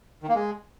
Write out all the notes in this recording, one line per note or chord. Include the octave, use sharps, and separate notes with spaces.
D#3
A#3
G#3